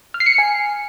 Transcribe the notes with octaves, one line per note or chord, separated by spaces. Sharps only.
F6
C7
C#7
C7
G#5